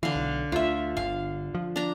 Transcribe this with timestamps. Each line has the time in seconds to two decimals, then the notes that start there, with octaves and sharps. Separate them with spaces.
0.03 D3 E3 F5
0.15 B1
0.52 D2 F4 E5
0.97 G1 F5
1.55 F3
1.76 D4 A#5